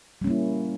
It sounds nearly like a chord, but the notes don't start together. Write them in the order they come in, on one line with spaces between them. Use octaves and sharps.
G3 C#4 A#3 E4